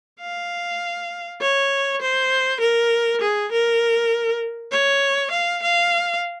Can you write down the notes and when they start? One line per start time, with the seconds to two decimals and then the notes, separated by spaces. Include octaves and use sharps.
0.21 F5
1.41 C#5
2.02 C5
2.61 A#4
3.21 G#4
3.52 A#4
4.71 C#5
5.31 F5
5.62 F5